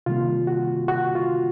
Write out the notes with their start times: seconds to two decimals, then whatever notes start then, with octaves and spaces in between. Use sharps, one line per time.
0.06 C3 D#3 G3 A#3 F4
0.47 F#4
0.88 F#4
1.15 F4